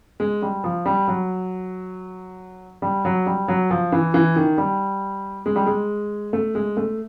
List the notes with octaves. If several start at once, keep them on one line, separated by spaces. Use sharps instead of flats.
G#3
G3
F3
G3
F#3
G3
F#3
G3
F#3
F3
E3
E3
D#3
G3
G#3
G3
G#3
A3
G#3
A3